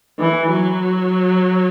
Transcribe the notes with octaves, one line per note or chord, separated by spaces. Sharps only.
E3
F#3